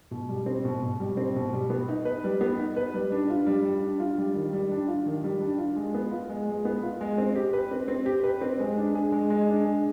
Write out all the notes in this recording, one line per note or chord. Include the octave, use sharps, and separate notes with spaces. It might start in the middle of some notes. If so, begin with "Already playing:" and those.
B2
G3
C4
B2
B2
G3
C4
B2
G3
B3
D#4
B4
G3
B3
D#4
B4
G3
D4
F4
G3
G3
D4
F4
G3
D#3
G3
D4
F4
D#3
G3
D4
F4
G#3
B3
F4
G#3
G#3
B3
F4
G#3
C4
G4
B4
C4
C4
G4
B4
C4
G#3
D4
G#4
G#3
G#3
D4
G#4